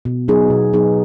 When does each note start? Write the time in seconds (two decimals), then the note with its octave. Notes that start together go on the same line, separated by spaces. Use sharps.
0.05 B2
0.28 F#3 B3 D#4 G#4
0.50 B2
0.73 F#3 B3 D#4 G#4